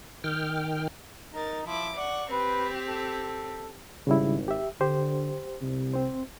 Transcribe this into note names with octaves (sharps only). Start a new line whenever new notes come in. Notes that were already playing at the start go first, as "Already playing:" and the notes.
D#3 G5 F6
D#4 A#4 A6
F3 E4 D6
D5 F#5 C#6
C4 G4 B4
A4
G#1 C#3 G3 E4
G4 E5
D3 G4 C5
C2 C3
C4 C5